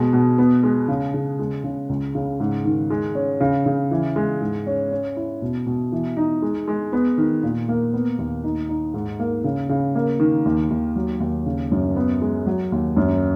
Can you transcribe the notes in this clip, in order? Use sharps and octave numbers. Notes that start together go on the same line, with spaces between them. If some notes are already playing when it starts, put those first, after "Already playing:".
Already playing: B2 G#3
B2
B3
G#3
C#3
C#3
G#3
C#3
C#2
C#3
G#2
D#3
G#3
C#4
C#3
C#3
E3
G#3
G#2
C#4
C#4
E4
B2
B2
E3
D#4
G#3
G#3
B3
D#3
A#2
A#3
B3
D#2
D#4
D#4
G#2
A#3
C#3
C#3
A#3
D#3
D#2
D#2
F#3
D#2
C#3
F#2
B3
G#3
F#3
D#2
F#2